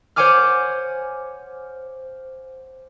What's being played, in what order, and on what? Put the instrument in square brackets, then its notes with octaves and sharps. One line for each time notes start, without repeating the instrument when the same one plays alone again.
[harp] C5 C#5 F#5 G#5 D6 F6